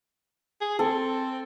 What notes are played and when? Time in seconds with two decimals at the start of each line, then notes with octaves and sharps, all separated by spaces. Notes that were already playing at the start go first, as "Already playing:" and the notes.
0.61 G#4
0.79 C4 A4